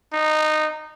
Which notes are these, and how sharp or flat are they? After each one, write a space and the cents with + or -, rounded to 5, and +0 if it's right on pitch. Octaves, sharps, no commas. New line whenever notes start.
D#4 -15